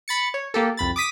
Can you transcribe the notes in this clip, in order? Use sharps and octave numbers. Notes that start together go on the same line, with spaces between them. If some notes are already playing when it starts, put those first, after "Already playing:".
B5 A6 C#7
C#5
A#3 G4 A4
C2 F2 B5 A6
D6 D#6 B6 D#7